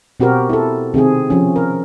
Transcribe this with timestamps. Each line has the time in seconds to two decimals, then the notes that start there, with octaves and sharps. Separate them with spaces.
0.20 B2 C4 F#4 G4 A#4
0.49 E4 A4
0.94 C3 D#3 C4 G#4
1.30 F3 C#4
1.56 A#4